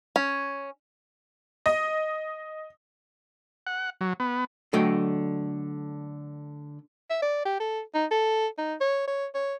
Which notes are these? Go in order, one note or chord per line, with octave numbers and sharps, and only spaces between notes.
C#4
D#5
F#5
F#3
B3
D3 F#3 A3 D#5 G5
E5
D5
G4
A4
D#4
A4
D#4
C#5
C#5
C#5